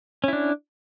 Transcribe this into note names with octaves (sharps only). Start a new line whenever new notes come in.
C#4 D4 E4